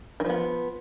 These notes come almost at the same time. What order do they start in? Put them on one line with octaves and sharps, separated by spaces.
D#3 F3 B3